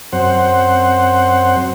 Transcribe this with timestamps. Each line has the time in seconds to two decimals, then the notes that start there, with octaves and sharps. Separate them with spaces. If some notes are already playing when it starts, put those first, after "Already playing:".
0.12 F#2 C4 C5 F#5